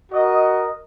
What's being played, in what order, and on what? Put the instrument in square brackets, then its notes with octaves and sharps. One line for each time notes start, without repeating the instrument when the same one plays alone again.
[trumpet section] F#4 A#4 D#5